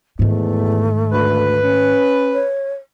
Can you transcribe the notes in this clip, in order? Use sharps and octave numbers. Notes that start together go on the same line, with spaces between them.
E2 G#2 D#3 A3
D2 B4
C#4
C#5